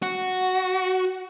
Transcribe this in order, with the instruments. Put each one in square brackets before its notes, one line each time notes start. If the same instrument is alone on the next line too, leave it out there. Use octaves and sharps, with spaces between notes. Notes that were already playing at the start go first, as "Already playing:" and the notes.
[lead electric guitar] F#4